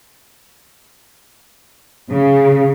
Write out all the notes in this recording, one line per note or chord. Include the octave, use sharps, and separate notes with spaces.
C#3